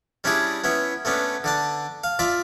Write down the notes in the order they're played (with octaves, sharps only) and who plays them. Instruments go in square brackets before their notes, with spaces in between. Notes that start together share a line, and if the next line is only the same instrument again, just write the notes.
[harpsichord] G3 C#4 D4 E4 G#4
B3 C#4 E4
A3 B3 C#4 D4
D3 D4 A5
F5
F4 D5 E5